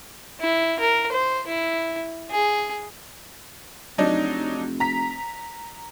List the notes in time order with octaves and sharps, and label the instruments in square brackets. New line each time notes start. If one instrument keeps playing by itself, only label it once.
[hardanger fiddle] E4
A#4
C5
E4
G#4
[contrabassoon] F1 [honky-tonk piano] F#3 D4 D#4
[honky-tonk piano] A#5 B6